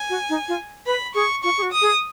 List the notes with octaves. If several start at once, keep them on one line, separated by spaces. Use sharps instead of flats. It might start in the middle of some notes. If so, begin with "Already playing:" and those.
Already playing: G#5
F#4
D#4
F4
B4 B5
G#4 C#6
F4 C#6
G#4
F#4
D#6
G#4